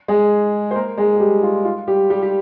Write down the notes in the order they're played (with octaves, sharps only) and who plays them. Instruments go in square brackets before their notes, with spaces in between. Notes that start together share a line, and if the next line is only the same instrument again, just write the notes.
[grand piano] G#3 G#4
C5
A#3 A#4
G#3 G#4
G#4
G3 G4
F4
F4
G3 G4
G3 G4
G4